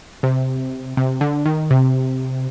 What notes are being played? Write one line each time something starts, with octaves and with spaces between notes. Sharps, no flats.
C3
C3
D3
D#3
C3